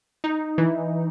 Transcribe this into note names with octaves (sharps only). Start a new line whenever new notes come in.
D#4
E3